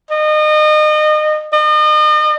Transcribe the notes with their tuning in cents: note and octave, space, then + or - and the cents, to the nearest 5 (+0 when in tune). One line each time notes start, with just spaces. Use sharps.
D#5 -30
D#5 -40